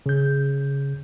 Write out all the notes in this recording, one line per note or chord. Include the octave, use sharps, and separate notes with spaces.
C#3 G6